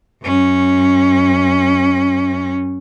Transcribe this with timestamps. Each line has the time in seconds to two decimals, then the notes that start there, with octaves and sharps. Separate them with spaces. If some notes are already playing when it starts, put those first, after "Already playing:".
0.22 F#2 C#4